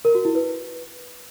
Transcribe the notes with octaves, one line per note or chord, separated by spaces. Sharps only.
A#4
F#4
E4
B4